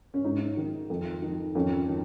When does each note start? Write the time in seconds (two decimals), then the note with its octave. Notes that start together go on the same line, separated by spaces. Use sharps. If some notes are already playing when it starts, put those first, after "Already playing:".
0.14 C#4
0.24 G#2 D#4
0.57 D#3
0.90 F2
1.22 D#3
1.55 F2 C#4
1.88 D#3